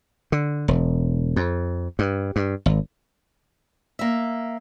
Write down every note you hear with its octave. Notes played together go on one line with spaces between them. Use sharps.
D3
E1
F2
G2
G2
G#1
A#3 E5